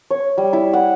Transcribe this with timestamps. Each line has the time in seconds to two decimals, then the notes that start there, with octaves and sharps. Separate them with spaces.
0.11 C#5
0.38 G3
0.53 E4
0.73 F#5